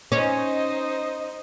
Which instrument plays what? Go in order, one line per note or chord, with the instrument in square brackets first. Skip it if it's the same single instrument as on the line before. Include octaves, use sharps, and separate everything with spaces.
[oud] C#4 [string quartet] D#4 C5 D#5